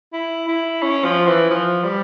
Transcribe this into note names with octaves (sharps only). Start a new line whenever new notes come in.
E4
E4
C#4
F3
E3
F3
G3